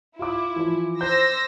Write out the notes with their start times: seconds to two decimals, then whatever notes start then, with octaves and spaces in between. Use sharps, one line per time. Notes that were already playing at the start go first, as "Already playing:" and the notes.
0.19 E4 F4 D6
0.56 E3 F3
1.01 C5 E6 G6 A#6